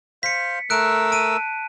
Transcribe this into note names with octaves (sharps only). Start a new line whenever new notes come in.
C5 F5 B6 C#7
A3 A#4 E6 F#6 D7
A5 D7 D#7